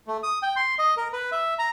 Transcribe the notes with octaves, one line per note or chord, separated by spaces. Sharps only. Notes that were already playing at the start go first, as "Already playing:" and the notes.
A3
D#6
G5
C6
D#5
A#4
B4
E5
A#5